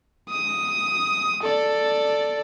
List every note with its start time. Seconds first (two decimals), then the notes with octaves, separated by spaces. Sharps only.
0.30 D#6
1.42 A4 D5